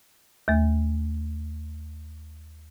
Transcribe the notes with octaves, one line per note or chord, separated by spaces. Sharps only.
D#2 A3